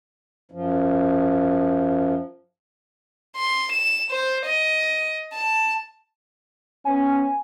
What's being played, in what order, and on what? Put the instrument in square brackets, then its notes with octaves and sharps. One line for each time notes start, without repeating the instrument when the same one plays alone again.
[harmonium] F#2 F3
[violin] C6
E7
C5
D#5
A5
[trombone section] B3 C#4 [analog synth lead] G#5